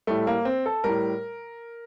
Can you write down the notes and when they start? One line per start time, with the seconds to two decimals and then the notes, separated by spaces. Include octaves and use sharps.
0.07 A2 G3 A3
0.27 A#3
0.45 C4
0.66 A4
0.84 A2 G3 A#4